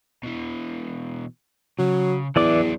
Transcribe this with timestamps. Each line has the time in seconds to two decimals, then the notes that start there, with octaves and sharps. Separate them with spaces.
0.24 B2 E3
1.79 C#3 F#3
2.36 E2 E3 F#3 D4 D5 D6